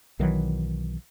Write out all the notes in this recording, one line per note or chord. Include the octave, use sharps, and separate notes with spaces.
B1 D#3 E3 F#3